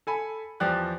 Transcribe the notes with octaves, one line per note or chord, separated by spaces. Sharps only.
A4 G#5 B5
E2 F3 G4 D5 F#6